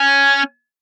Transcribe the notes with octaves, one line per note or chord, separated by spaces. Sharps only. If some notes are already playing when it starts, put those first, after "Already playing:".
Already playing: C#4